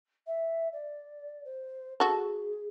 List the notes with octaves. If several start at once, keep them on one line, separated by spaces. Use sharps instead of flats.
E5
D5
C5
F#4 G#4 A4